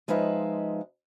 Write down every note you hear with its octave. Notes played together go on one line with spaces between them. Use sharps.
F3 G#3 D#4 F4 B4 E5